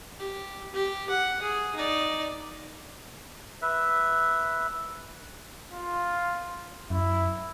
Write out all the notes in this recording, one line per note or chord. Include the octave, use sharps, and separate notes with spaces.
G4
G4
F#5
G#4
D#4 D5
B4 E5
F4
F#2 E4